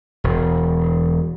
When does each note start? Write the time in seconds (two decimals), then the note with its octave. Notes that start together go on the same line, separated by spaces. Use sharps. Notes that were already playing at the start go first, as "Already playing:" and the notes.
0.24 E1